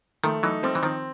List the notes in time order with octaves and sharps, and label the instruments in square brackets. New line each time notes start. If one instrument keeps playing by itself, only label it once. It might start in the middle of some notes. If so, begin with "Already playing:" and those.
[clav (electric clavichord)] D#3 F3 [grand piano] A3
[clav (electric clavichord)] E3 F#3 [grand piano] D#4
[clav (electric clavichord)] F3 G3 [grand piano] C4
[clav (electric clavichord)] E3
[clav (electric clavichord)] D#3 F3 [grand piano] C4